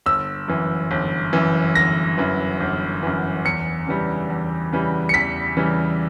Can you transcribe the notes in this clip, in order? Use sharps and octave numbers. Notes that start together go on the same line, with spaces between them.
G1 E6
F#2 E3
G1
F#2 E3
G1 A#6
F#2 E3
G1
F#2 E3
E2 C#7
C#3 E3 G3
E2
C#3 E3 G3
C#7
E2 B6
C#3 E3 G3